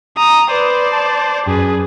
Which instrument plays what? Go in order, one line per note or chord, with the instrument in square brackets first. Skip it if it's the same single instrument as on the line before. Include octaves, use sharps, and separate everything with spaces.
[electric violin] A#5 D#6
[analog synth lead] B4 [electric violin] C5 D5
[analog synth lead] A5
[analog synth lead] F#2 [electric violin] G#4 B4